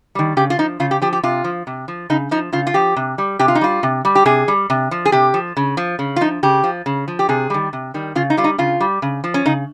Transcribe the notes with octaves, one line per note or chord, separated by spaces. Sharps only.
D#3 G3
C#3 G4
F4
F3 D#4
C#3 F4
G4
F3 G4
G4
C3 F4
F3
C3
F3
C#3 D#4
F3 D#4
C#3 F4
F4
F3 G4
C3
G3
C3 G4
F4
D#4
G3 F4
C3
G3
G4
C3 G#4
G3
C3
F3
G#4
C3 G4
F3
C#3
F3
C#3
F4
F3 D#4
C#3 G4
F3
C#3
F3
G4
C3 G#4
D#3 G3
C3
D#3 G3
C#3 F4
D#4
G3 F4
D#4
C#3 F4
G3
C#3
F3
C#4
C#3 D#4